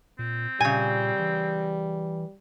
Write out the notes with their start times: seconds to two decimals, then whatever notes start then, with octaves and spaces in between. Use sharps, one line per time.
0.19 A#2 C4
0.61 A#2 C#3 G3 G#5
1.20 E3